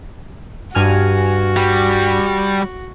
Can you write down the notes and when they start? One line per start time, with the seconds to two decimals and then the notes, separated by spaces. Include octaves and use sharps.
0.75 G2 F#4 G#5 F6
1.56 G3